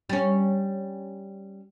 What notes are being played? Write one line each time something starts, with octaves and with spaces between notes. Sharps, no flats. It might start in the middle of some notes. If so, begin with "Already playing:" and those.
G3 C#4